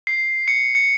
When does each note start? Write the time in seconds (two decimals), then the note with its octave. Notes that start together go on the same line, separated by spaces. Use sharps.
0.07 C7
0.48 C#7
0.75 C#7